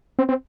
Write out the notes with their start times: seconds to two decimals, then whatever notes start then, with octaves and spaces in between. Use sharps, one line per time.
0.19 C4
0.29 C4